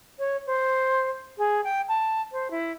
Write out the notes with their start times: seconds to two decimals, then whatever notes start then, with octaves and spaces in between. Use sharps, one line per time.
0.18 C#5
0.46 C5
1.38 G#4
1.64 G5
1.88 A5
2.32 C5
2.50 E4